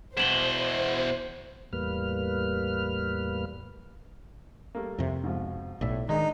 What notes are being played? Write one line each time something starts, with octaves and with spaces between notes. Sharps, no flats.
E2 B2 C5 E7 F#7 G7
E2 A2 G3 A#3 B4 F6
G3 A3 A#3
F2 C3
G#2 B2 F3
B1 A2 D5 E5
D#3 G#3 D4 D#4 G#5